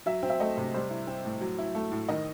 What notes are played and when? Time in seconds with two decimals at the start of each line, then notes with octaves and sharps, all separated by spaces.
0.06 F#3 E5
0.23 C4
0.30 E5
0.40 A3 D#5
0.57 C3
0.74 G3 C5
0.90 E4
1.07 C4
1.25 A2
1.41 F#3
1.59 E4
1.75 A3
1.92 A2
2.09 D#3 D#5